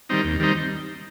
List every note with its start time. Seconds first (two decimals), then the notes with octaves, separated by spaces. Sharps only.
0.09 D#3 G3 C4 D#4
0.24 D#2
0.40 D#3 G3 C4 D#4